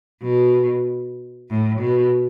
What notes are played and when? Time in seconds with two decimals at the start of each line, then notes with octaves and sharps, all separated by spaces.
0.23 B2
1.50 A2
1.81 B2